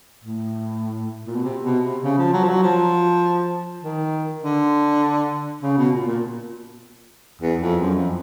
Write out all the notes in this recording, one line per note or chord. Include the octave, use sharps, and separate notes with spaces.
A2
A#2
B2
C3
B2
C3
C#3
F3
F#3
F3
F#3
F3
D#3
D3
C#3
B2
A#2
A#2
E2
F2
F#2
F2